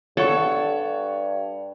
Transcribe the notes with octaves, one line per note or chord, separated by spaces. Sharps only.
G2 A4 C#5 F#5 C#6